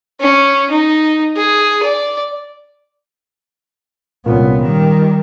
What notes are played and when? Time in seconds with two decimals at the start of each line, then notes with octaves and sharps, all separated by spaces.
0.20 C#4
0.70 D#4
1.37 G#4
1.83 D5
4.26 C2 A#2 B3 C#4
4.61 D#3 G3